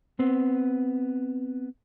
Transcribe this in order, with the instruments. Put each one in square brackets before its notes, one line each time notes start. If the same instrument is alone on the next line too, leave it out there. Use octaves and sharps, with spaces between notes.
[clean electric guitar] B3 C4